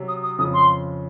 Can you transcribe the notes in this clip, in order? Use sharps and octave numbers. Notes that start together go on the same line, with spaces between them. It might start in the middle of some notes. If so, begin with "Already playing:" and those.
Already playing: C3 F#3 C#4
D#6
D#6
F2 C#3 F3 D#6
C6